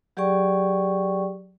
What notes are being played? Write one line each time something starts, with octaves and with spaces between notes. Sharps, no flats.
F#3 G4 G#4 D5 G5 C#6